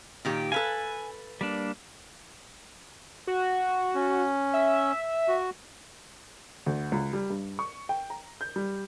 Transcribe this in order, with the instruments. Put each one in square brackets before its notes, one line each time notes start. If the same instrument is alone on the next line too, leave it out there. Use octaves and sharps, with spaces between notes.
[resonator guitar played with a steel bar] A#2 D#3 G4
[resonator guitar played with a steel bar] A4 B4 F5 [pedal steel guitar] G#5
[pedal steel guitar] G3 A#3 D4
[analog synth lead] F#4
[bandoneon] C#4
[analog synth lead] E5
[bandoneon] F#4
[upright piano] D2
C#2
G3
G2
C#6
G5
A#5
G6
G3